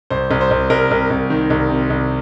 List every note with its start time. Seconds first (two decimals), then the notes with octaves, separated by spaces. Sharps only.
0.10 C2 C5
0.31 C2
0.41 C5
0.51 C2
0.70 C2 A#4
0.91 C2
1.10 C2
1.30 D#3
1.50 C2
1.70 C3
1.90 C2